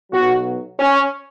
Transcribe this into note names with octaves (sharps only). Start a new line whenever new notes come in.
B1 B2 F#3 F#4
C#4